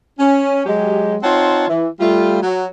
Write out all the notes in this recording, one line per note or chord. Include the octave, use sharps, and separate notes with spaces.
C#4
F#3 G#3 G4
C4 D#4 F4 C#5 F#5 A5
E3
G3 A3 F4
F#3 F#4